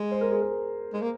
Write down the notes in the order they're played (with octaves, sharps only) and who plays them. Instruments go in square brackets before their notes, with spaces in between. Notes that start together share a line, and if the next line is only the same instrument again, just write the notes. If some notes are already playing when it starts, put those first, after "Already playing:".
Already playing: [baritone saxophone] G#3
[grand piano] C5
A#4
G#4
A#4
[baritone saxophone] G#3
A#3